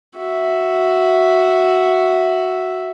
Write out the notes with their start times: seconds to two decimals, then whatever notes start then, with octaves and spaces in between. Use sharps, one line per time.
0.16 F#4 E5